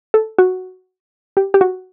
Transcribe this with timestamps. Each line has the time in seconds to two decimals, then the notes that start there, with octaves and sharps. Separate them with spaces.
0.14 A4
0.38 F#4
1.37 G4
1.54 G4
1.61 F#4